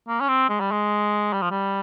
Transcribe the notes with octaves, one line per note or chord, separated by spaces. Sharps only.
A#3
C#4
C4
G#3
G3
G#3
G3
F3
G3